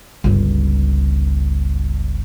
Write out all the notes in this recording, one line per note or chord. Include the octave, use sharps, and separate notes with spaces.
G1 C#2